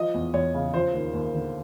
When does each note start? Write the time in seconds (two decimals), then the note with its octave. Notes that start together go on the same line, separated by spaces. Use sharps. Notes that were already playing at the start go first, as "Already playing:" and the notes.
Already playing: F3 D#5
0.14 E2
0.34 E2 C#5
0.54 C#3
0.74 F3 C5
0.94 D#2
1.14 D#2
1.34 D3